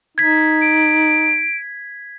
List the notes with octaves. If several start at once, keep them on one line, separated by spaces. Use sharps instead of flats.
D#4 G#6 B6
D7